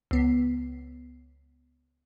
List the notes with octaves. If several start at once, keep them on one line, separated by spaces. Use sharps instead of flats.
C#2 B3 C7